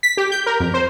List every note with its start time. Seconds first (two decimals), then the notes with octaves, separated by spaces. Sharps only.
0.03 B6
0.17 G4
0.32 G6
0.46 A#4
0.60 F2
0.74 C5